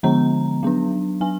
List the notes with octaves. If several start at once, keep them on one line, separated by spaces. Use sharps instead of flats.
D3 F3 G#3 B3 A#5
F#3 B3 D4
F#3 D4 G#5